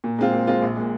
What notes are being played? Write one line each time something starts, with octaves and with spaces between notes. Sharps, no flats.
A#2
G#3 C4 F4
A#2
G#3 C4 F4
A#1
A#2 G#3